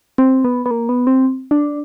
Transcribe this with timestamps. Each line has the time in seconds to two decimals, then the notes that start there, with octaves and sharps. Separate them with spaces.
0.18 C4
0.45 B3
0.66 B3
0.71 A#3
0.89 B3
1.07 C4
1.51 D4